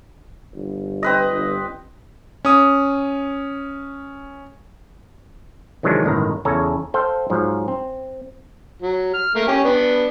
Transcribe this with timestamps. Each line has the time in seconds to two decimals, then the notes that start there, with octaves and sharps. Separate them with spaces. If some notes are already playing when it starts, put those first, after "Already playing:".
0.55 G1
1.03 C4 B4 D#5
1.32 G1
2.45 C#4 D#6
5.83 C3 D#3 E3 F#3 G#3 D4
6.04 G1 C#2 A2 D#3 A#5
6.45 E2 C#3 A4 C#5 G#5 A#5
6.94 A4 C5 F5 G5
7.30 G#2 F3 F#3
7.68 C4
8.82 F#3
9.14 F6
9.35 A3 A#3
9.48 C#4 G4
9.64 B3 D4